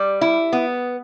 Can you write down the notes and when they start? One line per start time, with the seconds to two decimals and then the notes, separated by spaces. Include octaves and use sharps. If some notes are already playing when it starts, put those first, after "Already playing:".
Already playing: G3
0.21 E4
0.53 B3